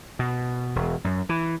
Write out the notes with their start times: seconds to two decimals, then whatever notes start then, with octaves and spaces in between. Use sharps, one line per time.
0.19 B2
0.76 E1
1.04 F#2
1.29 E3